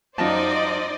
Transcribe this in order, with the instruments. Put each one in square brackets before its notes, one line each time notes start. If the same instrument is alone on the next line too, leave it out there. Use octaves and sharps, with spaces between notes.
[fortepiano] F#2 F4 A5 [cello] D#4 [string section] C5 D5 D#5